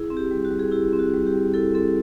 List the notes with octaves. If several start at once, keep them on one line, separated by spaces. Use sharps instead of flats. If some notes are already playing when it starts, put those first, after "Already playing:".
Already playing: E4 G#4
C4
G4
G3
F#4
G3
G#4
E4 G4
C4
F#4
G3
G4
G3
E4 A4
C4 A4